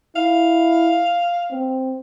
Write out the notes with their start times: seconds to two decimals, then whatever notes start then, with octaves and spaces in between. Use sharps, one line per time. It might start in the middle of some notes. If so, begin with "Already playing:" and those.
0.16 E4 F5
1.51 C4